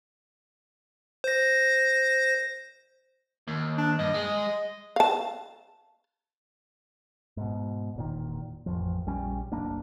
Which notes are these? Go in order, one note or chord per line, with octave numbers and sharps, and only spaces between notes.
C5 A#6
D#2
D4
G2 D#5
G#3
F5 A5
G#2 B2
E1 A#2 D#3
A1 F2 F3
A#1 G3 C#4
F#1 B1 A#3 D4